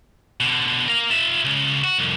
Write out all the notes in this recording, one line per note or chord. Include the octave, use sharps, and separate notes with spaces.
B2 D3
A#4 F5
F4 E5
C#2
F#4
C2 F2